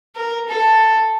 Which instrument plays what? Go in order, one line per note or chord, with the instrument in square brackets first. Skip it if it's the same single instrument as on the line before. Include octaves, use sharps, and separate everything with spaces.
[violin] A#4
A4